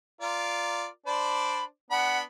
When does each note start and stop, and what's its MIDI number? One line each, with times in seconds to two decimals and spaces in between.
0.21 0.86 65
0.21 0.86 70
0.21 0.86 74
1.06 1.64 62
1.06 1.64 72
1.06 1.64 74
1.06 1.64 83
1.91 2.22 59
1.91 2.22 62
1.91 2.18 78
1.91 2.22 83